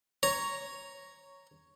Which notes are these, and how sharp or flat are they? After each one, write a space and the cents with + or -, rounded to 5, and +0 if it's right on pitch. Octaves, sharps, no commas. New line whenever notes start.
C#5 +0 A#5 +0